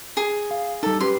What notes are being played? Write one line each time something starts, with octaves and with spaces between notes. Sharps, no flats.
G#4
F5
G3 D#4 A4
C#4 G4 B4 C6